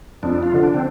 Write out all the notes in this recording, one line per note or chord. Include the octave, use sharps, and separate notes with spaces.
F2 D4
F4
D3 F3
D4
C4